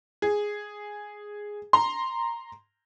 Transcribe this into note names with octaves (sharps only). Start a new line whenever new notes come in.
G#4
A#5 C6